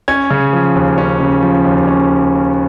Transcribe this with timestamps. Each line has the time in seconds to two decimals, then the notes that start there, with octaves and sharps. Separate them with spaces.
0.08 C#4 G#6
0.31 C#3
0.53 F3
0.76 D#2
0.98 C#4
1.20 C#3
1.43 F3
1.65 D#2
1.88 C#4